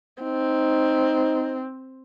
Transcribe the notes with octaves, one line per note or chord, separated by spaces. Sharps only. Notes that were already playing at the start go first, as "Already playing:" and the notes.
C4 D#4